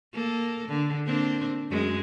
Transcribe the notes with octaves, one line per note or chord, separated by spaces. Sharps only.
A#3 A4
D3
A#3 C4 D4
F#2 G#3